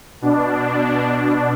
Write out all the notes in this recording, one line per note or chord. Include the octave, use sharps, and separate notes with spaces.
B2 D4